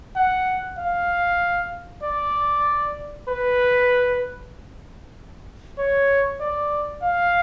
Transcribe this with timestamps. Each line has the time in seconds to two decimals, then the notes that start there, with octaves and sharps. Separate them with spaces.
0.16 F#5
0.79 F5
2.03 D5
3.29 B4
5.78 C#5
6.40 D5
7.03 F5